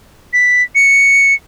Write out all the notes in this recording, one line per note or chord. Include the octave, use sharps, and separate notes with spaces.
B6
C#7